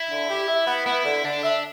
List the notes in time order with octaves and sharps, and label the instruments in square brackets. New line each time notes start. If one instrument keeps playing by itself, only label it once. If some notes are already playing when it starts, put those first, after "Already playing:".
Already playing: [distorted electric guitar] E4
[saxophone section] D3
G4
E5
B3
[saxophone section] B3 [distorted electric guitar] E4
[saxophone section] D3
[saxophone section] D3 [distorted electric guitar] D4
[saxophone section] E5